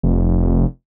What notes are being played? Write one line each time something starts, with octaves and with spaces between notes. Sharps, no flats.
F1